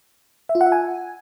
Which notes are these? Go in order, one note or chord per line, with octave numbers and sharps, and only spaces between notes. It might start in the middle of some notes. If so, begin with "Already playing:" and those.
E5
F4
F#5
E5
G#5